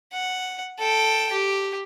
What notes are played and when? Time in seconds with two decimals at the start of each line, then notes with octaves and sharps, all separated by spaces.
0.13 F#5
0.79 A4 G5
1.32 G4